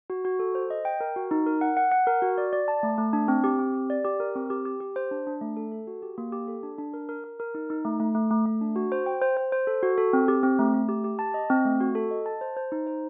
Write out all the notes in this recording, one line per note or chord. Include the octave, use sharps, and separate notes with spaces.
F#4
F#4
A4
C5
D#5
G5
A#4
F#4
D#4
A#4
F#5
F#5
F#5
A#4
F#4
D5
D5
A5
A3
A3
D4
C4
G4
C4
G4
D5
G4
A#4
C4
G4
G4
G4
C5
D4
D4
A3
A4
A4
F#4
G4
A#3
G4
A4
D4
D4
A#4
A#4
A#4
A#4
D#4
D#4
A3
A3
A3
A3
A3
D4
F#4
C5
G5
C5
C5
C5
A4
F#4
A4
C4
G4
C4
A3
A3
G4
G4
A5
D#5
C4
A3
F#4
A4
D#5
A5
C5
C5
D#4
C5